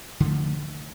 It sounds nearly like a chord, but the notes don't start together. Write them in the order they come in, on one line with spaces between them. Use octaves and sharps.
D3 A3 F3